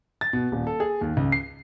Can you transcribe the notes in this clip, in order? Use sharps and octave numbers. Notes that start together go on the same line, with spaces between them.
A6
B2
D#1
A4
G#4
D#2
C#2
C7